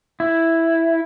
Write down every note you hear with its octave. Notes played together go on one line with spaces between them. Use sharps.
E4